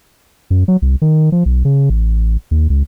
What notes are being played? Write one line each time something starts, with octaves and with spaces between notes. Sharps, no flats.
F#2
F#3
C2
D#3
F3
B1
C#3
A1
D#2
C#2